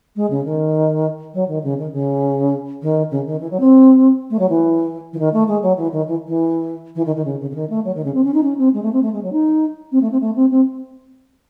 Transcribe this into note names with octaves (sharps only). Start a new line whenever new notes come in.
G#3
C#3
D#3
F#3
D#3
C#3
D#3
C#3
D#3
C#3
D#3
E3
F#3
C4
A3
F#3
E3
E3
D#3
A3
G#3
F#3
E3
D#3
E3
E3
E3
D#3
D#3
C#3
C#3
C#3
D#3
A3
F#3
D#3
C#3
C4
C#4
D#4
C#4
C4
G#3
A3
C4
A3
G#3
F#3
D#4
C4
A3
C4
A3
C4
C4